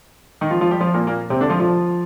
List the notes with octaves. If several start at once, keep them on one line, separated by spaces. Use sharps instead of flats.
D#3 D#4
F3 F4
F3 F4
G3 G4
F3 F4
A#2 A#3
A#2 A#3
C3 C4
D3 D4
F3 F4
F3 F4